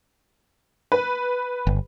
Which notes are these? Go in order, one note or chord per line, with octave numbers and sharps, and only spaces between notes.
B4
G1